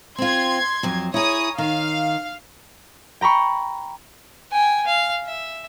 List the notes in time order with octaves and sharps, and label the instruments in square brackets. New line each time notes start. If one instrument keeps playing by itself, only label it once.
[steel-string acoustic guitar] C4 F4 [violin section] C6 G#6
[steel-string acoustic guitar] F2 F#3
[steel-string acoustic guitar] E4 G#4 [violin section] C#5 A#5 D#6
[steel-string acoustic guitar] D#3 [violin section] F5
[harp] G5 A#5 B5 C#6
[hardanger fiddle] G5 G#5
F5
E5